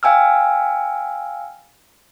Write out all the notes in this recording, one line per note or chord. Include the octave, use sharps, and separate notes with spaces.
F5 G5 G#5 E6 F6